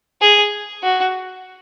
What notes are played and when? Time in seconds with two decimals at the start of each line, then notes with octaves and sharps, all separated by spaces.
0.21 G#4
0.83 F#4